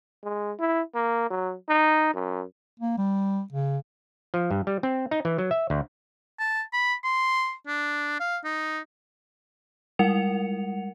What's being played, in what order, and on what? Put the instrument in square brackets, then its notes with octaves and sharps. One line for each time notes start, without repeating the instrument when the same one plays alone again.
[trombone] G#3
E4
A#3
F#3
D#4
F#2
[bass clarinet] A#3
G3
C#3
[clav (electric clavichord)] F3
G2
G3
C4
D#4
E3
F#3
E5
D2
[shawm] A5
B5
C6
D4
F5
D#4
[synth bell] G3 G#3 A#4 F#5 C#7 F7